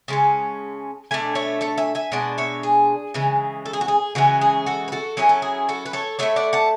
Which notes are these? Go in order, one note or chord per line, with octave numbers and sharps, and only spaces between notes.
C#3 G#3 C#4 A5
B2 A3 D4 G#5
C#5 E5
A4 C#5
E5 G#5
E5 G#5
B2 G#3 D4 D5 F#5
C#5 E5
G#4
C#3 E3 G#3
A4
G#4
F#4
G#4
C#3 E3 G#3 C#4 F#4
G#4
F#4 A4
B4
F#4 A4
F#3 C#4 E4 G#4
A4
G#4
F#4 A4
B4
A4 C#5
D3 A3 E4 C#5 E5
D5 F#5
F#5 A5